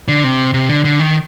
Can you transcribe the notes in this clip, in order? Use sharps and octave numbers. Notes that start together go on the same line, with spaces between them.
D3
C3
C3
D3
D3
D#3